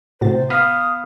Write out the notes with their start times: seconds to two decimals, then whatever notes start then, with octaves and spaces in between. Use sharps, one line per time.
0.21 A2 C3 F#4 C5 A6
0.50 B3 F5 D#6 B6